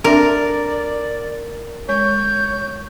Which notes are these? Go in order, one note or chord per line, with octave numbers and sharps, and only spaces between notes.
C4 D4 A#4 D5 E5
G#3 C#5 G6